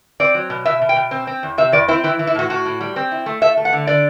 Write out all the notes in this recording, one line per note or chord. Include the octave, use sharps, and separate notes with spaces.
C4 D5
F#3
B2
B2 E5
B2
G5
B2
C4
C4
E2
C3 E5
E2 D5
C4 E4
E3 E4
E3
E4
A2 F#4
A2 F#4
A2
G3
C4
E4
A3
A3 E5
A3
F#5
D3
D3 D5